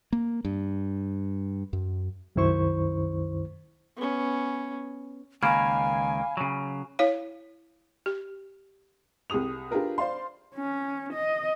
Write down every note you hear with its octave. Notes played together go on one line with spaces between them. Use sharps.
A#3
G2
F#2
C2 F#2 D#3 E4 C5 C#6
B3 C#4
C#2 D#3 A#3 F5 G#5 B5 F6 G#6
C#3 F#3
E4 C#5 F5
G4
C2 G4 G#4 D#6 F7
D4 F4 G4 G#4 A#4 B4
C5 D5 F5 C6
C#4
D#5